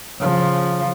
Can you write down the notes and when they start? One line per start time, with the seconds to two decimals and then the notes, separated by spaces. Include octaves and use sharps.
0.20 C#3 F3